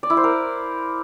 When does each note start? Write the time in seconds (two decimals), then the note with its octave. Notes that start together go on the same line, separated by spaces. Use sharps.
0.03 D5
0.10 E4
0.17 C5
0.24 A#4